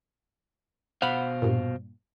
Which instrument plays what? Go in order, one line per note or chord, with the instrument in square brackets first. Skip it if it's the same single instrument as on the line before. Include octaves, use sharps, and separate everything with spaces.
[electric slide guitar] B2 C5 F5 [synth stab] F#5 B5
[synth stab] G2 A#2